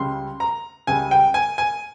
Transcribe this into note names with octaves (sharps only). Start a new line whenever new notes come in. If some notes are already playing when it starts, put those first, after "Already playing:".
Already playing: C#2 C#3 G3 C6
A#5
C#2 C#3 G3 G#5
G5
G#5
G#5